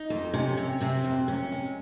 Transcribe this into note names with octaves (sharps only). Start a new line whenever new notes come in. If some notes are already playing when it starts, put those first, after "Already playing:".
Already playing: D#4
F2
C3 C#4
C3
C3 C4
F2
C3 C#4
G#3